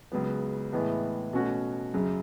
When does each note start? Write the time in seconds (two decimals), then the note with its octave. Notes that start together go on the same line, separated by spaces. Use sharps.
0.12 C#2 C#3 F#3 B3
0.73 A2 E3 G#3 B3
1.33 B2 A3 C#4 F#4
1.94 F#2 C#3 F#3